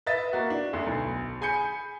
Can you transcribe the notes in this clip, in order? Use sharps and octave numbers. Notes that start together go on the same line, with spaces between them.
B4 D#5 E5 A6 B6
A#3 F#4
D4
D2 D3
B1
G#4 G#5 B5 G6 C#7